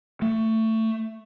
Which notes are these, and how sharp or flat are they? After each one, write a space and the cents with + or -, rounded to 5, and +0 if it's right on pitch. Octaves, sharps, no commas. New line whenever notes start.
A3 +20